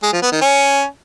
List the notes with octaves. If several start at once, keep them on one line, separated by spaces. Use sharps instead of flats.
G#3
F3
B3
D#3
C#4